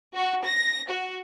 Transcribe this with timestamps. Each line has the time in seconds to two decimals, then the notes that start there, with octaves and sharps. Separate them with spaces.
0.15 F#4
0.44 A#6
0.89 F#4